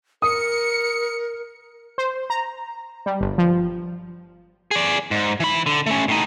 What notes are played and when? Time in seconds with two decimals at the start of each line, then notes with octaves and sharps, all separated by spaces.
0.22 A#4 D#6 C#7
1.98 C5
2.30 A#5
3.06 G3
3.21 G1
3.38 F3
4.71 G#4 D5
5.11 G#2
5.40 E3 B5
5.66 D3
5.86 A3 C#4
6.08 A2 D#4